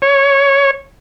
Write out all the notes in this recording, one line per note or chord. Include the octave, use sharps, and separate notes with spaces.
C#5